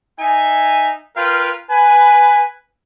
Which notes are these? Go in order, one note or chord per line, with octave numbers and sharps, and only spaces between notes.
D#4 E5 G#5
F4 A#4 B4 F5 G5
B4 G#5